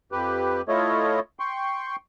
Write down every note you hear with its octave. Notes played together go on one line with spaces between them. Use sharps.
F2 G4 B4
A3 E4 F4 A4 C#5 D#5
G5 C6 C#6